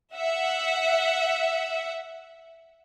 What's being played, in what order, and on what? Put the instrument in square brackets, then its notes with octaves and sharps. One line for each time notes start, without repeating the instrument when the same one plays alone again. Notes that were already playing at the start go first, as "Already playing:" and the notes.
[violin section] E5 F#5